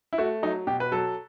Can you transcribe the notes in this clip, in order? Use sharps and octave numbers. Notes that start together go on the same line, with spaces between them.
E4
A3 F#4
F#3 D#4
B2 G4
B4
F#3 A4